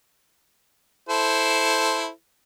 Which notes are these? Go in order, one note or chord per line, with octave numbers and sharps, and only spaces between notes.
E4 A4 C5